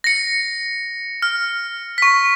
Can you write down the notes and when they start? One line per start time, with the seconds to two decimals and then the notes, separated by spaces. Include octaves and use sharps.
0.04 A#6 C#7
1.22 F6
1.98 C#6 B6